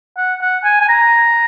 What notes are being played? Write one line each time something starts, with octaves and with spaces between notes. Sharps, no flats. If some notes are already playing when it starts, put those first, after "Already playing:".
F#5
F#5
G#5
G#5
A#5